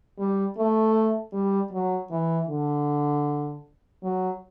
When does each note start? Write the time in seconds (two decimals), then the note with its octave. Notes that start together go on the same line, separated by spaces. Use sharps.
0.18 G3
0.56 A3
1.33 G3
1.72 F#3
2.11 E3
2.48 D3
4.03 F#3